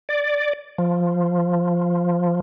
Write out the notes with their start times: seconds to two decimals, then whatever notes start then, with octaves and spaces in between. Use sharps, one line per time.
0.09 D5
0.78 F3